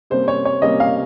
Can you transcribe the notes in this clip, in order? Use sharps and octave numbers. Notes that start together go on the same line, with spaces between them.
C3 G3 A#3 C#4 C5
C#5
C#5
C3 G3 A#3 C#4 D#5
F5